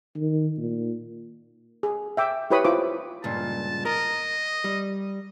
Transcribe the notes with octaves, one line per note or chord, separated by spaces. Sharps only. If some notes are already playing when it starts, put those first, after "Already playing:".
D#3
A#2
G#4
E5 G5 D6
E4 G4 B4 C#5 B5 D#6
E4 F4 C5 D6
C#2 G2 A#2 A5
A#4 D#5
G3